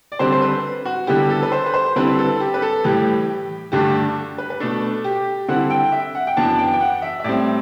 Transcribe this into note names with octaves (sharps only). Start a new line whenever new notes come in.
D5
D3 G3 C4 C5
C5
B4
F#4
D3 G3 B3 E4 G4
A4
B4
C5
B4
C5
D3 G3 C4 E4 B4
A4
G4
B4
A4
A2 E3 G3 G4
G2 D3 A3 D4 G4
B4
B4
B2 A3 D4 A4
G4
D3 G3 C4 E4 F#5
G5
E5
F#5
G5
F#2 E3 B3 D4 A5
G5
G5
F#5
E5
E5
A2 G3 C4 D5